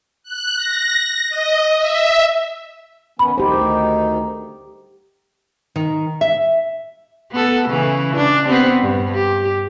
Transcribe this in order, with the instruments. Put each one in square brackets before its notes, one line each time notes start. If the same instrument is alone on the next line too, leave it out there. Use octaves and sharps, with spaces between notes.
[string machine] F#6
A#6
D#5
E5
[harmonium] D#3 B3 C#4 [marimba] B5
[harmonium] D2 D#3 D#4 [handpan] G4 C5
[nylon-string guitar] D#3
E5
[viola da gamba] B3 A4
C#3 E3
D4
B3 C4 G4
G2
G4